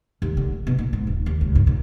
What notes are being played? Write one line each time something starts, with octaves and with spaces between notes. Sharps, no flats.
D#2
D3
A#2
B2
A#2
G#2
D#1
D#2
C#2
G2
A#2